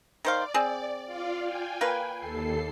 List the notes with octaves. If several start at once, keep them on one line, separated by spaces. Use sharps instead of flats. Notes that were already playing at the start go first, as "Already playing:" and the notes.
D#3 C5 D5 F5
C4 G#4
F4 D5 F5
G5 G#5
A#3 F4 B4
D#2 A4 C7